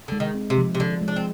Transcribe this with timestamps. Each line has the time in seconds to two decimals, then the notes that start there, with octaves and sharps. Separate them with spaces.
0.08 D3 G#3
0.20 D#3
0.34 C4
0.50 C3
0.58 F3
0.75 C3
0.80 D3 F3
1.02 G#3
1.08 D4
1.16 C4